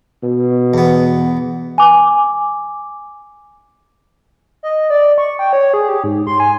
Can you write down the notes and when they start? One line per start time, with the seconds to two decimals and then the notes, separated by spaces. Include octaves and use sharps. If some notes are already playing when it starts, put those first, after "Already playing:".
0.24 B2
0.74 E2 B3
1.78 G#5 D6
4.63 D#5
4.90 D5
5.18 C#6
5.39 G5
5.53 C#5
5.74 G#4
5.89 G4
6.04 G#2
6.27 C6
6.40 G#5